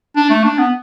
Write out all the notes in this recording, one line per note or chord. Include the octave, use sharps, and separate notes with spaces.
D4
A3
D4
B3